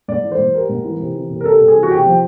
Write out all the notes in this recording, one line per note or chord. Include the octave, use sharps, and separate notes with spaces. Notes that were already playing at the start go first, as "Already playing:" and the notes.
G#2 D5
E3
C5
G#2
G3 A#4
G#2
E3
C3
E3
C3
A#4
G3 A4
C3
G#4
E3
F#4
C3 G4
F3